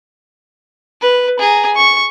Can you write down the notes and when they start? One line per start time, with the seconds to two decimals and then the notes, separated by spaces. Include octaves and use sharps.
1.01 B4
1.39 G#4 A#5
1.75 C#6